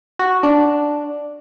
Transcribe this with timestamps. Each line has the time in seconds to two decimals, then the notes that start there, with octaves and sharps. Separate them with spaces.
0.19 F#4
0.43 D4